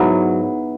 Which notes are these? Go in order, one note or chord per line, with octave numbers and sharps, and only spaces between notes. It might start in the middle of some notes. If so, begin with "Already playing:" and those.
Already playing: G#2 F#3 B3 E4